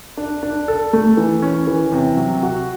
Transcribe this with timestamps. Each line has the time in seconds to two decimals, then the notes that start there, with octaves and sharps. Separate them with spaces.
0.17 D4
0.43 D4
0.68 A4
0.93 A3
1.17 E3
1.42 C#4
1.67 E3
1.92 C3
2.17 F#3
2.43 F#4